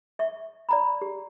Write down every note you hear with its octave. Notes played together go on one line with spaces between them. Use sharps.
E5 C#6
D5 A#5 B5
G4